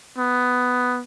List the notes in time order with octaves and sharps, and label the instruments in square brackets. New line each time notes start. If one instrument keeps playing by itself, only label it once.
[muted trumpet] B3